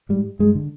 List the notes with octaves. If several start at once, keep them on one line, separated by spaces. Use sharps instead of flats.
G#2 G3
G2 G#3
D3